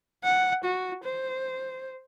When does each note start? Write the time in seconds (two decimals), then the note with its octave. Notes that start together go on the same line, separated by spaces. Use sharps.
0.24 F#5
0.64 F#4
1.04 C5